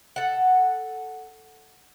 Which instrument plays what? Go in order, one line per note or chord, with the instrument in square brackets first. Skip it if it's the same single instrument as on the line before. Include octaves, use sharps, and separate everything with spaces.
[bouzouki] A4 F#5